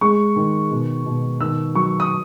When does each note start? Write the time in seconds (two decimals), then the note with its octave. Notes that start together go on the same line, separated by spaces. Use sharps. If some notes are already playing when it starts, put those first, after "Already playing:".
0.01 G#3 C#6
0.36 D#3
0.71 B2
1.05 B2
1.41 D#3 E6
1.75 F#3 C#6
2.00 D#6